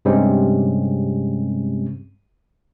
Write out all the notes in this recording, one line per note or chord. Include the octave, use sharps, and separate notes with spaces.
G2 C3 G3 G#3 C4 C#4